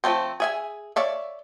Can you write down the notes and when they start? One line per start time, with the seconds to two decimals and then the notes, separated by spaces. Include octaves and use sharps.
0.04 F3 G3 A3 C4
0.40 G#4 E5 G#5
0.96 C#5 D5 E5 F5